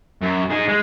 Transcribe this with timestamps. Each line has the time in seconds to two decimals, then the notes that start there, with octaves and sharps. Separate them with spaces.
0.21 F#2
0.50 D#4 G#4
0.68 G#3